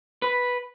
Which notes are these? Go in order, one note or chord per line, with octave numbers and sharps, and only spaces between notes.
B4